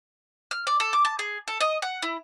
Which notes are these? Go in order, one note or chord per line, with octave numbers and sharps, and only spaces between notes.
F6
D5
A4
D6
A5
G#4
A4
D#5
F#5
E4